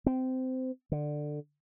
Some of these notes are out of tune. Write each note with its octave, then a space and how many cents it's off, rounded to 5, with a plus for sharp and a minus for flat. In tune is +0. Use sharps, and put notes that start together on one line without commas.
C4 -20
D3 +15